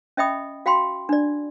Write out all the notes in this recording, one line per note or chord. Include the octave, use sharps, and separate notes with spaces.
C#4 D#5 E5 G5 B5 D#6
F#4 F5 G5 B5 C6
D4 D5